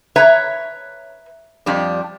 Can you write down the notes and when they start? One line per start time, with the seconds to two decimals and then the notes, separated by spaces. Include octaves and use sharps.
0.16 B4 C#5 E5 A#5
1.66 F2 G3 D4